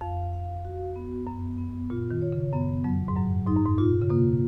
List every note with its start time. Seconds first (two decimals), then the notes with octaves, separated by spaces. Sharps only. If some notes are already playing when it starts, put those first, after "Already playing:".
0.01 F2 F5
0.33 F5
0.65 F#4
0.96 B3
1.27 F#2 B3
1.58 B3
1.90 A#2 F4
2.11 D#3
2.21 C#5
2.32 C#3
2.53 F#2 B3
2.84 F2 F#3
3.08 G#2
3.15 F#2 F#3
3.46 G#2 D#4
3.56 F#2
3.66 G#2
3.78 A#2 F4
4.02 C#3
4.10 B2 A#3